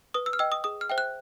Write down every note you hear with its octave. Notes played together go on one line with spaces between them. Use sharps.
B4 D#6
E6
F6
D#5 G5 E6
D#6
G#4 D#6
F6
C5 E5 G5
F#6